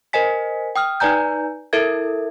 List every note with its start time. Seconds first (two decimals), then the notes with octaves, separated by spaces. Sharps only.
0.13 A#4 C5 D#5 G#5 B6
0.76 G5 D#6 F6
1.00 D#4 B4 D5 G#5 A#5 G6
1.73 E4 A4 A#4 E5 G#6